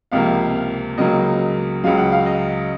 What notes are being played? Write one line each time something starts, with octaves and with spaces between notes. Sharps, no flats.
C#2 C3 F3 A#3 F5
C#2 C#3 F#3 A#3 D#5
C#2 C#3 F#3 F5
F#5
F5
D#5